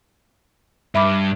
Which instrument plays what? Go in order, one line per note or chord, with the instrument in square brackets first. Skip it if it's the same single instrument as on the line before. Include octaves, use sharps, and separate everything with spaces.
[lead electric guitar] G2 [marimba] E5 B5 D6